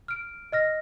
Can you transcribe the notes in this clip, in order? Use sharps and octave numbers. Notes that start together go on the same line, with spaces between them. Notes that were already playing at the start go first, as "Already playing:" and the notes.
F6 D7
D#5 F6 A#6